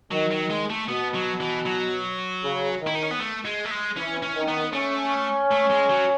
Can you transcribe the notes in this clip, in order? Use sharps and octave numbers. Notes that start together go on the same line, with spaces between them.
D#3 F#3
F#3
G#3
A3
B2 B3
F#3
E3
F#3
C#3
D#3
E4
D#4
C#4
B3
A3
G#3
A3
G#3
E3 C#4
C#4
D#3
B3
A3 C#4
A3
G#3
F#3